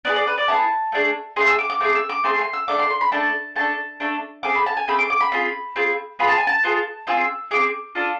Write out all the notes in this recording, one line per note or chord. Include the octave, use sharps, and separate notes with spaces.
B3 E4 G#4 D5
D5
B4
D5
B3 E4 G#4 A5
A3 D4 G#4
A3 D4 G#4 C6
E6
D6
D6
A3 C4 G#4 D6
E6
D6
A3 C4 G#4 C6
C6
E6
A3 D4 A4 D6
C6
C6
B5
A3 D4 A4 A5
A3 D4 A4 A5
A3 D4 A4
A3 C4 G#4 D6
B5
A5
G#5
A3 C4 G#4 B5
D6
D6
B5
C4 F4 G#4 B5
C4 F4 G#4
B3 F4 G#4 B5
A5
G#5
A5
B3 F4 G#4
C4 F4 G#4 E6
C4 F4 G#4 D6
D4 F4 A4